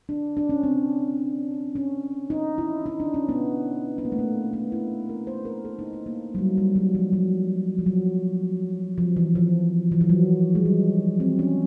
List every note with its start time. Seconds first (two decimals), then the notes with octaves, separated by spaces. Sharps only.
0.09 D4
0.37 D4
0.49 C#4
0.63 C4
1.76 C#4
2.30 D#4
2.58 E4
2.86 D#4
3.00 D4
3.14 C#4
3.29 B3
3.98 B3
4.05 A#3
4.12 A3
4.19 A#3
4.53 B3
4.72 E4
5.09 A#4
5.27 C5
5.45 A#4
5.65 A4
5.79 D#4
5.93 D#4
6.06 A#3
6.35 F#3
6.38 G3
6.58 G3
6.75 F#3
6.95 F3
7.13 F#3
7.79 F3
7.86 F#3
8.98 F3
9.16 E3
9.35 F3
9.92 E3
10.01 F3
10.09 F#3
10.55 G#3
10.65 G3
11.20 C4
11.39 C#4